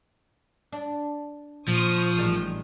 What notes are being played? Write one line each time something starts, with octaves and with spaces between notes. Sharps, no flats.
D4
A#2 F3 C5 C#6 D#6
A1 D#3 G3 G#3